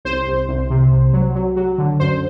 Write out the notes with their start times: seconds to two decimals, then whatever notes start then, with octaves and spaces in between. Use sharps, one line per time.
0.05 C2 C5
0.27 C2
0.48 C2
0.70 C3
0.92 C2
1.13 F#3
1.35 F#3
1.56 F#3
1.78 D3
2.00 F#2 C5